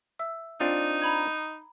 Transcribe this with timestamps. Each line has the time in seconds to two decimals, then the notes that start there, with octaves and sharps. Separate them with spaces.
0.19 E5 E6
0.60 C4 D4 D#4 F4
1.02 A#5 B5 G#6